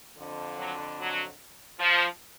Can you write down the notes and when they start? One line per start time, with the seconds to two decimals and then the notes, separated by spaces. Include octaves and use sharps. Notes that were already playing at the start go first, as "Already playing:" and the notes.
0.17 F2 D3
0.58 F#3
0.99 F#3
1.80 F3